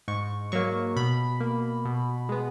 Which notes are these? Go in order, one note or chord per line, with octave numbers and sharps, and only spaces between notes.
G#2 C#6
F#3 A#3 C#6
B2 B5
A#3
B2
G#3 B3